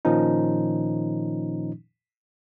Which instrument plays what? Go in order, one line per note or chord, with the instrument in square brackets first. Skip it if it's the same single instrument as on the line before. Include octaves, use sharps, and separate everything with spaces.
[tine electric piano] A#2 D#3 F3 C#4 D#4